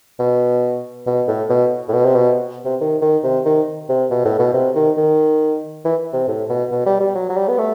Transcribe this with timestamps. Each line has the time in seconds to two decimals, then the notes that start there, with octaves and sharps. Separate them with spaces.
0.20 B2
1.07 B2
1.28 A2
1.50 B2
1.89 A2
1.93 B2
2.05 C3
2.15 B2
2.65 C3
2.81 D#3
3.02 D#3
3.24 C3
3.45 D#3
3.89 C3
4.10 B2
4.25 A2
4.39 B2
4.54 C3
4.75 D#3
4.97 D#3
5.85 E3
6.13 C3
6.28 A2
6.50 B2
6.71 B2
6.86 G3
7.00 G3
7.15 F#3
7.29 F#3
7.37 G3
7.48 B3
7.58 A3